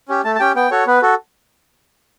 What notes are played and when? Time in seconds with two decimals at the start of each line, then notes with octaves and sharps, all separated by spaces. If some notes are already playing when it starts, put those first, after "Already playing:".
0.09 C#4 G4
0.24 A3 A5
0.36 A5
0.40 C#4 G4 G5
0.55 B3 G5
0.71 F#4 A4 C#5
0.87 B3 B4
1.02 F#4 A4